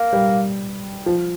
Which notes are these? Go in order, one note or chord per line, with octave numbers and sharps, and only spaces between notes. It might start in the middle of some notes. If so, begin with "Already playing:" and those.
Already playing: A#3
G3
F3